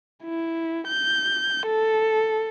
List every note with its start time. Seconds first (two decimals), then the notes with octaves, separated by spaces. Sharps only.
0.24 E4
0.87 G6
1.66 A4